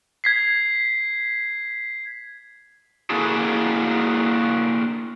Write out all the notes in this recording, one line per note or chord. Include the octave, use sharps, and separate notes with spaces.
G#6 B6 C7
A#3 D4 E4 F#4 G#4 A4